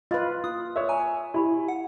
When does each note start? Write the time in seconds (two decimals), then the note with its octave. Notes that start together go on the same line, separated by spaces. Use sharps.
0.11 F4 B4 D#5 F5 C6
0.44 F4 D#6
0.76 A#4 C#5 E5
0.89 G#5 A#5
1.34 E4 G4 B5 C6
1.68 F#5